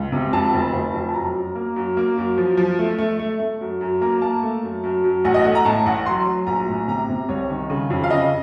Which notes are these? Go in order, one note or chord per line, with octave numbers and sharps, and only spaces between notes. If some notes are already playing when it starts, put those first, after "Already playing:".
Already playing: C#2
C3
F2 A5
F1
F1
F2
A5
F#2 A#5
F#2
A#3
F#2
A#3
F#2
F3
F3
A3
A3
A3
A3
F#2
F#2
A#3 A#5
A#3 A5
A3
F#2
F#2
F#2
A1 F#5
D#5
A3 F#5
A#5
A2 A5
A1 F#5
F#3 C6
F#3
A#1 A#5
A2
C3 A#5
C3
C2 C#5
D#3
C#3
F2
F5
C#3 D#5